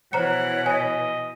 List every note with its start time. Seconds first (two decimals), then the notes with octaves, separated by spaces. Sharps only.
0.13 B2 E3 C5 C#5 F#5 A#5 C#7
0.66 D#5 G#5